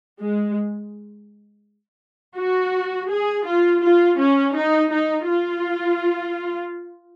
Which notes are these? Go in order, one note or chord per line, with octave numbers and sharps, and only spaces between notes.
G#3
F#4
G#4
F4
F4
C#4
D#4
D#4
F4